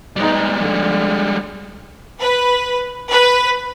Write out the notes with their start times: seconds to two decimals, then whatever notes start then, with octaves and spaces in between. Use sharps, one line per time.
0.16 G3 G#3 B3 D#4
0.56 D3 F3
2.20 B4
3.10 B4